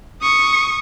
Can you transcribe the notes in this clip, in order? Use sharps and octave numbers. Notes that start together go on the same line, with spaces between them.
C#6 D#6